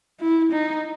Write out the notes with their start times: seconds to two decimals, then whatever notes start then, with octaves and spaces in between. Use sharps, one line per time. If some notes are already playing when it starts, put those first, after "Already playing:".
0.20 E4
0.52 D#4